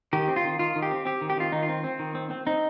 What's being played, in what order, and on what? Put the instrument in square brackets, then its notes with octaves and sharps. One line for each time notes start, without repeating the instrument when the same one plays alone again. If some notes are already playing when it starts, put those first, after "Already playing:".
[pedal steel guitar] D#3 G4
C4
F4
D#3
D#3 F4
D#3
G4
C4
C4 G4
D#3
G4
D#3 F4
D#3 D#4
F4
C4
C4
D#3
C4
C4
C4 D#4